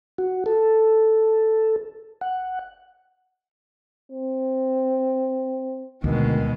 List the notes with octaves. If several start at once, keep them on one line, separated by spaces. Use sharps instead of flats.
F#4
A4
F#5
C4
D2 B2 D#3 G#3